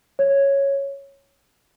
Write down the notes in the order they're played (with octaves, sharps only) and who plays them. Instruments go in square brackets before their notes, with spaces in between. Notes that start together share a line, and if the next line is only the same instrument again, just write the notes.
[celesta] C#5